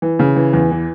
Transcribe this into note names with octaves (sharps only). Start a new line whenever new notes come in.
E3
C#3
E3
E2
E3